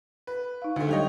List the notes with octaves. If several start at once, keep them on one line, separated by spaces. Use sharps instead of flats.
B4
D#4 F5
D2 D3 A3 D4
F#3 G3 G4 C#5 D#5